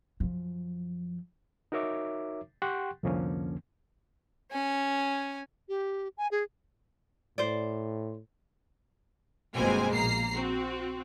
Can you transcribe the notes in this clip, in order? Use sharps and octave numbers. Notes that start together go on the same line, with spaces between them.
F#2 F3
D#4 F#4 A#4 C#5 E5 D6
G4 F#5 G5 C6 C#6 F#6
C2 F2 D3 F3 A#3 C#4
C#4 G#5
G4
G#5
G#4
A2 C5 D5
G1 B2 G#3 A#3 C4 G#5
A#1 A#3 A#5 C7
C4 F#4